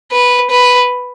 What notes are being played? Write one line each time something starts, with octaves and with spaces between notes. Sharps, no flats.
B4
B4